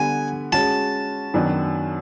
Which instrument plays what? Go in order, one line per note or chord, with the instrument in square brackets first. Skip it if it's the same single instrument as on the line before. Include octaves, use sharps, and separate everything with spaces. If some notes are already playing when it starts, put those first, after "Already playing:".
Already playing: [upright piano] D3 G3 B3 [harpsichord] G#5
[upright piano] G#3 C#4 F#4 [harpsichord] A5
[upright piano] F#2 D#3 F#3 B3 D4